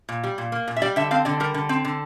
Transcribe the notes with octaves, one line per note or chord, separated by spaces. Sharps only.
A#2
G3
A#2
A#3
A#2
E5
G3 D5
D3 E5
C4 F5
D3 D5
G3 A#4
D3
C4
D3